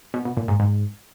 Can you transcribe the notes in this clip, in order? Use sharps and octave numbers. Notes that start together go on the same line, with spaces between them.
B2
B2
A#2
G#2
G#2